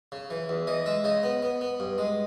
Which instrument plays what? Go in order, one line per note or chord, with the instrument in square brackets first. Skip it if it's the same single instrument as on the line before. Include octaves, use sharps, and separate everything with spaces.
[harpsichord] C#3
E3
E2
E3 D#5
G#3 E5
C#3 D#5
B3
B3
B3
G2
G#3